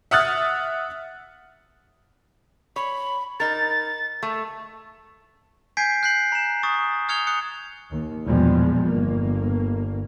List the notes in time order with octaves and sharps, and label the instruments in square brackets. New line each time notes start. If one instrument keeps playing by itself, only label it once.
[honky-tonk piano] E5 F#5 D#6 F6 F#6 A6
[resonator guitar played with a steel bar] C#5 [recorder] B5
[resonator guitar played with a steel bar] D#4 A#4 [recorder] A6
[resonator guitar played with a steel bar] A3
[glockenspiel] G#5 G6 G#6 B6 C7 D7
F#6 G6 B6 C7 F#7
A#5 E7
C#6 D#6 A6
D#6 F6 G#6 C#7 F7 G7
D#6 F#6 C#7
[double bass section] D#2
A#1 E2 B2 F3 G3 G#3
G1 A#3